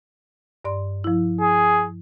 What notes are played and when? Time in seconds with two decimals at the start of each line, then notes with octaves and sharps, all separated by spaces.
0.65 G2 D5 C6
1.04 F3 E4
1.41 G#4